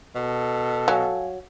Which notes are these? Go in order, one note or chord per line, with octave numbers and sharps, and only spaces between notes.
B2 A4
F#3 F5 G#5